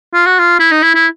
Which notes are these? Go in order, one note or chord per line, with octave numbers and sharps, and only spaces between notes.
F4
F#4
F4
E4
D#4
E4
E4